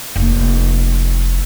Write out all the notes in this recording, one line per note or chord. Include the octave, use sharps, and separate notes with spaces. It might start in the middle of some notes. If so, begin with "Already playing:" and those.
F1 A#3